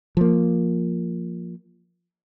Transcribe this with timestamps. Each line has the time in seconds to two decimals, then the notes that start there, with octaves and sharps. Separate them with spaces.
0.17 F3 A#3